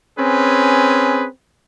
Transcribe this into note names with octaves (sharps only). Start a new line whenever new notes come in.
C4 C#4 G#4 B4